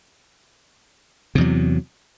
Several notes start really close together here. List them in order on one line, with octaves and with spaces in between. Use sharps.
C3 E2 F#3